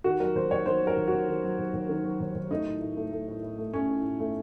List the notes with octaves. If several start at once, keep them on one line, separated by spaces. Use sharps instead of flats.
D#3 F#4
F#3 A#4
D#2 C5
D#2 C#5
D#3 C5
F#3
A#4
D#2
D#2 F#4
D#3
F#3
D#2
D#2
D#3
F#3
D#2
D#2
A3 D#4
A2
A2
A3
A3
A2
A2
A3
A3 C#4
A2
A2
A3